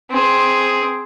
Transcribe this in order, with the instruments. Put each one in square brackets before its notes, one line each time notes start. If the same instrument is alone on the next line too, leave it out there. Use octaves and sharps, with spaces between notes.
[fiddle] C4 G#4